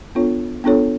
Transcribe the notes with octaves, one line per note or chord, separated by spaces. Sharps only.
B3 D4 F4 A4 C#5
B3 D4 F4 A4 C#5